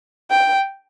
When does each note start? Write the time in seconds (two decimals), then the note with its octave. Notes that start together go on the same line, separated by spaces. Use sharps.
0.30 G5